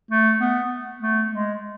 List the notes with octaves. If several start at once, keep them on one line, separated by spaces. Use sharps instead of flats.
A3
B3
A3
G#3